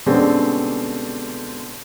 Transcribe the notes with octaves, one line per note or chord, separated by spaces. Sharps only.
B2 D3 G3 G#3 C4 C#4